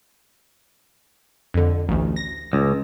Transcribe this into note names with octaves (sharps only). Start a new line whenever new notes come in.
F2 D3
A1 D2
A#6
C#2